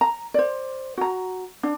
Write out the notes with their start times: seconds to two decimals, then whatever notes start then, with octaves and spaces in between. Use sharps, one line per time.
0.01 A#5
0.34 C5 D5
0.97 F#4 A#5
1.63 D4